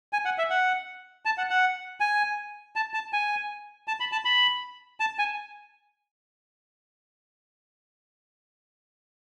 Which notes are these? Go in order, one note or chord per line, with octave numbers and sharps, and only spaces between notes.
G#5
F#5
E5
F#5
A5
F#5
F#5
G#5
A5
A5
G#5
A5
B5
A5
B5
A5
G#5